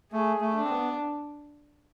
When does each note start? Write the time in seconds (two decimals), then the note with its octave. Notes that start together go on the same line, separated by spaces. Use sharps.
0.12 A3 G#4
0.41 A3
0.55 D4
0.64 C4
0.70 B3